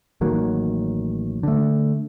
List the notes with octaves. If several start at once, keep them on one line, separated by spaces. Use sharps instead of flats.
A1 D#3 F#3 A#3
D3 A3